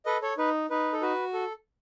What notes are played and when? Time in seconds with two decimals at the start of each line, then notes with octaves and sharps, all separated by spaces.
0.06 A4 B4 D#5
0.22 A4 C#5
0.38 D#4 B4
0.70 D#4 B4
0.93 A4
1.02 F#4 B4
1.34 A4